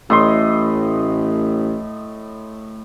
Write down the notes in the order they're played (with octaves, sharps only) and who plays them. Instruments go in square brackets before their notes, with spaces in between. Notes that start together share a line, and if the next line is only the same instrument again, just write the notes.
[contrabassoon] A1 [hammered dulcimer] A2 D#5 C6